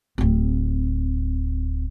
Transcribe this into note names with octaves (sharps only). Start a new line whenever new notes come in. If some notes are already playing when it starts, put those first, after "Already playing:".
D1 C4